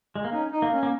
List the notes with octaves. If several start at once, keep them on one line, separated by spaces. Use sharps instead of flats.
G#3
A#3
C#4 D#4
D#4
A#3
C#4
A#3